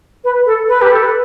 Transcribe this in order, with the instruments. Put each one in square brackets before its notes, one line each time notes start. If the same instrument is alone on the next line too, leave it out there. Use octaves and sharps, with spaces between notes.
[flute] B4
A4
B4
G4
A4
B4